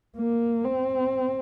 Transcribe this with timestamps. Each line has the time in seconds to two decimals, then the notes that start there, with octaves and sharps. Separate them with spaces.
0.17 A#3
0.64 C4